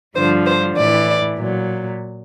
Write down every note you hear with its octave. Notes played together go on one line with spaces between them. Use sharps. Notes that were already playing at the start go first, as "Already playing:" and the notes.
G2 D3 F3 C5
C5
A2 E3 D5
A#2 F#3